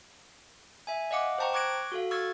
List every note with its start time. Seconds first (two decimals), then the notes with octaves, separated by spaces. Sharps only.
0.87 E5 G#5
1.11 D#5 F5 F#5 D6
1.38 C5 G5 A5 A#5 C#6
1.53 C#6 D6 F#6 G#6 A#6 D7
1.92 F#4 A4 F5
2.11 C#6 E6 F6 G#6 A6